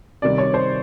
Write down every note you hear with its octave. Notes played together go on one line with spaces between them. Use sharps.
C3 D#3 G3 D5
C#5
C5